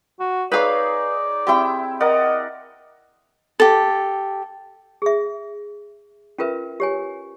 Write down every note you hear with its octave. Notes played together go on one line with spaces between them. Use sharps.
F#4
D#4 G#4 B4 C#5 D5 F5
C4 E4 G4 E5 G5
A#4 D5 D#5 F#5
G4 A4
G#4 E5
C#4 F4 A#4 B4 E5
G4 C#5 G#5